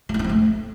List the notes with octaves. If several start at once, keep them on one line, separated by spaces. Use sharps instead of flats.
F#3
G3
C#4
C4
A3